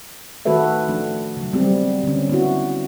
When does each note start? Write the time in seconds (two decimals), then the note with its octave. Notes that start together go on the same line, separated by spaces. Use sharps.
0.45 D#3 A3 F#4 A4 B4 E5
0.88 F3 A3 D4
1.37 C#3 F#3
1.53 G3 B3 C4 G4
2.03 D3 C#4
2.30 B3 E4 F#4